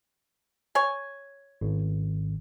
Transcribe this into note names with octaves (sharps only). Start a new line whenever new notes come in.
C#5 G#5
G#1